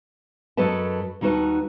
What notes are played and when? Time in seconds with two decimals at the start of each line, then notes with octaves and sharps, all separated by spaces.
0.57 F#2 F#3 A4 B4 D#5 A5
1.21 D#2 G3 D#4 F#4 B4 A5